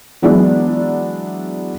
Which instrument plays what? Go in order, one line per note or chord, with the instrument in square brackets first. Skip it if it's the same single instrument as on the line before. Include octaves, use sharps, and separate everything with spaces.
[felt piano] E3 F#3 G#3 B3 D4 E4